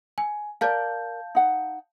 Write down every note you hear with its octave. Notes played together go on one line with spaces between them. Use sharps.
G#5
A#4 D5 F5 A5 G6
D#4 F#5